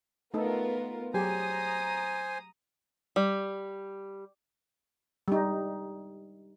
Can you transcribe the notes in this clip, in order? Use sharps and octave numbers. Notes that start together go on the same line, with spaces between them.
A3 B3 D#4 F4 A4 A#4
F#3 G4 G#4 C5 G#5 A#5 D#6
G3
G3 D#4